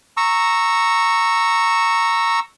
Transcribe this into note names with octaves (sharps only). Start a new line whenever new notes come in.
A#5 C#6 E6